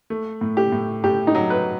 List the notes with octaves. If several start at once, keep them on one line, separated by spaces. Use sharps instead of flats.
A3
A2
G4
A2
A2 G4
D#4
F#3
B4